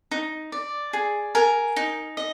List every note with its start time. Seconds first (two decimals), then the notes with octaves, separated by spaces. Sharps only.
0.11 D#4
0.52 D5
0.93 G#4
1.35 A#4 G#5
1.76 D#4
2.17 D#5